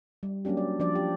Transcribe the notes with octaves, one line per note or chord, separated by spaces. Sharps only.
G3
F#3 A#3 C#4 D4 G4
D5
F3 D4 D5
G4